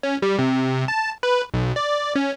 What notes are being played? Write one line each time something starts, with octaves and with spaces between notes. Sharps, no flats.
C#4
G3
C3
A5
B4
B1
D5
C#4